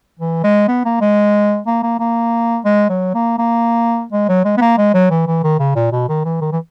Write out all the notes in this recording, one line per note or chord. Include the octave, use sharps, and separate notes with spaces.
E3
G#3
B3
A#3
G#3
A#3
A#3
A#3
G#3
F#3
A#3
A#3
G#3
F#3
G#3
B3
A#3
G#3
F#3
E3
E3
D#3
C#3
A#2
B2
D#3
E3
D#3
E3